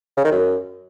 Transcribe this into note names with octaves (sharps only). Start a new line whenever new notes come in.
C#3
D#3
F#2